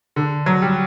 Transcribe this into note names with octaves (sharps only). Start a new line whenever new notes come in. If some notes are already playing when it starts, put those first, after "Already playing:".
D3
F#3
G3